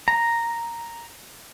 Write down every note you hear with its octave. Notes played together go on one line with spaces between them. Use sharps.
A#5